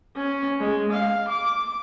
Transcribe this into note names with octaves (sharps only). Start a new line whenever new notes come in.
C#4
G#3
F5
D6